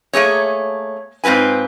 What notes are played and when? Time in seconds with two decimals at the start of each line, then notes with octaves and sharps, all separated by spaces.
0.13 A3 A#3 G#4 C#5
1.24 G#2 C4 F4 B4 G#5